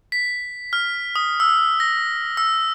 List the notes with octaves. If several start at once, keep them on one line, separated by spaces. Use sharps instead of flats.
B6
F6
D#6
E6
A#6
E6